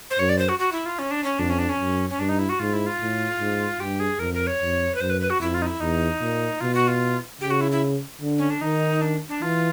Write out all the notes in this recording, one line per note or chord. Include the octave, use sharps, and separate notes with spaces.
C5
F#2 C#5
D5
C5
F#4
F#4
E4
F4
C#4
D4
C#4
F2 D4
C#4
D4
C#4
F#2
C#4
G2 D4
D#4
E4
F#4
G#2 F4
E4
F4
A2
G#2
G2 G4
G#4
F2 A#4
A#4
C#5
F2
B4
F#2 C5
B4
B4
F#4
F2 E4
F4
D#4
E4
E2 D#4
A#2
B2 F4
F#4
F4
C#3 G4
F#4
E4
E4
D3
C#4
D4
D#3 D#4
D4
D4
E3 F4